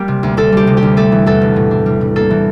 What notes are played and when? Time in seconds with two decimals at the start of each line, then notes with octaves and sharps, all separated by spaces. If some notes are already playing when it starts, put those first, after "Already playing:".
Already playing: G3 A#3 G4
0.08 C3
0.23 D2
0.37 D2 A4
0.52 G3 G4
0.67 C3
0.77 G4
0.83 D2
0.97 A3 A4
1.12 E3
1.26 E2 A4
1.41 E1
1.56 A2
1.71 D4
1.86 G3
2.01 A2
2.16 A#3 A4
2.30 E3